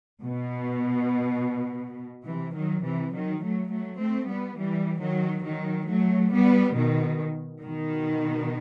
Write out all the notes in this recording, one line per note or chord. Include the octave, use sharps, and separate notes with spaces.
B2
C3 E3
D#3 F#3
C3 E3
D#3 F#3
F#3 A3
F#3 A3
A3 C4
G3 B3
E3 G3
D#3 F#3
D#3 F#3
F#3 A3
G3 B3
B2 D#3
B2 D#3